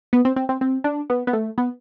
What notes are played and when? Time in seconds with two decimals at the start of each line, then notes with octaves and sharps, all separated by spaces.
0.13 B3
0.25 C4
0.36 C4
0.49 C4
0.61 C4
0.84 D4
1.10 B3
1.27 B3
1.33 A3
1.58 B3